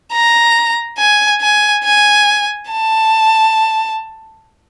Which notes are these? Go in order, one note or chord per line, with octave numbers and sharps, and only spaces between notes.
A#5
G#5
G#5
G#5
A5